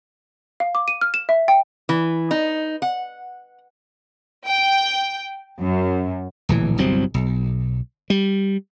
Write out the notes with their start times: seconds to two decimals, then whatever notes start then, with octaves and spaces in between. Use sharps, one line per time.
0.60 F5
0.75 D6
0.88 D#7
1.01 F6
1.14 E7
1.29 E5
1.48 G5
1.89 E3
2.31 D#4
2.82 F#5
4.48 G5
5.61 F#2
6.49 D1 A#1 E3
6.78 G1 C2 F#3 C4
7.14 B1
8.10 G3